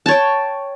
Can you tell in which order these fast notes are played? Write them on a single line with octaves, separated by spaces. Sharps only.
A5 C#5 G5